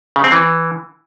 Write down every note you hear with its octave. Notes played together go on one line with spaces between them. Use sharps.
C#3
C4
E3